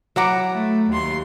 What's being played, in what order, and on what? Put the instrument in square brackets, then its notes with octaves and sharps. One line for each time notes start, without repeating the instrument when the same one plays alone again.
[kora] F#3 F#5 [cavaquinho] E4 A#5 D6
[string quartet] A3
D#2 C6